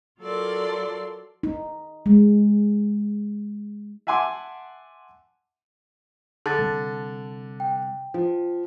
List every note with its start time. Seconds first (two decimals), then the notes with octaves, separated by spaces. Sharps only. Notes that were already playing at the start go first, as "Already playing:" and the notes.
0.20 F#3 F4 A4 A#4 D5 C6
1.43 D#4
2.06 G#3
4.07 E5 F#5 G#5 A5 C6 D6
6.46 D3 A5 A6
6.59 C3 G3
7.60 G5
8.14 F3